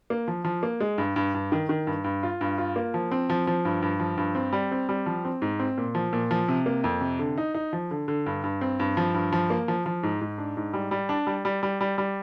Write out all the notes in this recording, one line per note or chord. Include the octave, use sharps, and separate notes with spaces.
A#3
F3
F3
A#3
G#3
G2
G2
G2
D#3
D#3
G2
G2
F4
G2
F4
A#3
F3
C4
F3
F3
G2
G2
F3
G2
C4
G3
C4
G3
F3
C4
G#2
C4
A#2
F3
A#2
F3
C3
A#3
F2
C3
D3
D#4
D#4
F3
D3
D3
G2
G2
C4
G2
F3
G2
F3
A#3
F3
F3
G#2
G#2
D4
G#2
G3
G3
D4
G3
G3
G3
G3
G3